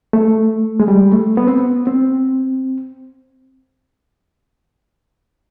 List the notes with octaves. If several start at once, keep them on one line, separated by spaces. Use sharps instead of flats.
A3
G#3
G3
A3
B3
C4
B3
C4